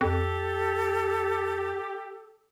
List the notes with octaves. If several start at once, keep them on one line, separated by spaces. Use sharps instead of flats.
F2 G4 A4